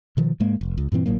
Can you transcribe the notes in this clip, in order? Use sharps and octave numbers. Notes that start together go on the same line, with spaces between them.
B2 D#3 F3
G#2 G#3 A#3
F1
C#2
G2 A#2 E3 C4
G#1 A2 F#3 A#3